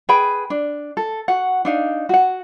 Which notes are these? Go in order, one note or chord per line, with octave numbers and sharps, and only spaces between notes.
G#4 B4 G5 B5
D4
A4
F#4 F#5
D4 D#4 F5
F#4 F#5